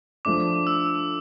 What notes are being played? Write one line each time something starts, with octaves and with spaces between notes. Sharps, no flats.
F3 A3 D4 D6
E6